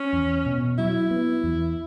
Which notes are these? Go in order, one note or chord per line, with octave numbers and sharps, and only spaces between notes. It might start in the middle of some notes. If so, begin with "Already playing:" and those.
Already playing: C#4
E2
B2
F#3 E4
B3
E2